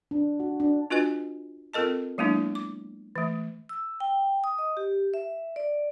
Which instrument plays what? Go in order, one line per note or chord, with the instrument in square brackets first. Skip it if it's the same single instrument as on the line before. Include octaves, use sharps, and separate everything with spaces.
[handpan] D4
F#4
D4
[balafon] D4 F4 F#4 B4 D#5 G#5
C4 F4 A4 A#4 D#5 A5
F#3 G#3 A#3 B3 D4 E4
D6
E3 A3
[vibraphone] E6
G5
D#6
D#5
G4
E5
D5